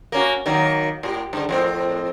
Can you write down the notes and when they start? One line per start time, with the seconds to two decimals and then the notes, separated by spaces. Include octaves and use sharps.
0.12 A#3 C#4 F#4
0.46 D#3 F#3 A#3
1.03 A2 F#4 G4
1.33 G2 D3
1.49 F2 A2 C4